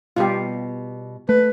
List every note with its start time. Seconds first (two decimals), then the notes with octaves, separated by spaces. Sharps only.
0.16 B2 G3 F4 G4
1.29 A3 B4